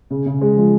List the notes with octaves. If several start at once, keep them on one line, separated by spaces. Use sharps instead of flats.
C#3
C#3
G#3
F3